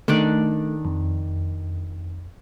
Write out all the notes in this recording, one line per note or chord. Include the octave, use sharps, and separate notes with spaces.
D#3 A3 D4 D5
F2